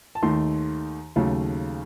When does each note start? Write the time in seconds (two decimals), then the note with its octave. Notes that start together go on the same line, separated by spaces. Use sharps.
0.15 A5
0.23 D#2 D#3 A3 C6
1.16 D#2 C#3 F#3 A3